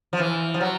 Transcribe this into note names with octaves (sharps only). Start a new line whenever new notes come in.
F3
E3
F3
F#3